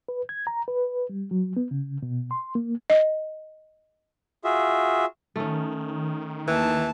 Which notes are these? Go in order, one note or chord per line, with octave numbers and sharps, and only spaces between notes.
B4
G#6
A#5
B4
G3
F#3
B3
C#3
B2
C6
A#3
D#5
F4 F#4 G#4 E5
D#3 A3 C#4
D#2 E3 A5